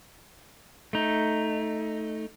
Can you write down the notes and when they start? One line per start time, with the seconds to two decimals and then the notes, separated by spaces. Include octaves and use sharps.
0.93 A3 D#4